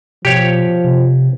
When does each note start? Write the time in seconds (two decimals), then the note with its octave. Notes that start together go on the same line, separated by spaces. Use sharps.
0.25 B2 F3 G4 C#5
0.84 C3